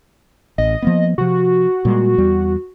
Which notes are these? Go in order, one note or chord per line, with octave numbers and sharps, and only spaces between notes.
A1 D#5
F3 A#3 B3
C3 F3 F#4
A#2 G3 G#3
E2 G3 B3